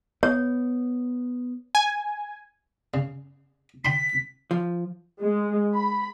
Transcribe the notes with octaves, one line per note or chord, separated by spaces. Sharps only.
B3 C#5
G#5
C#3
G5 B5 C6 B6
F3
G#3
B5